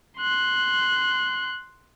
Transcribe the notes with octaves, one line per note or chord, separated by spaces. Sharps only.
C6 F#6